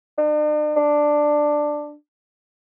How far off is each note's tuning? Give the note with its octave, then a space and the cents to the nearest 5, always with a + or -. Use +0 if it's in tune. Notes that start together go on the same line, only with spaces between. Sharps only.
D4 +45
D4 +10